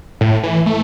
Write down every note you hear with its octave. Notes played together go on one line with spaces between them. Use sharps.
A2
E3
A3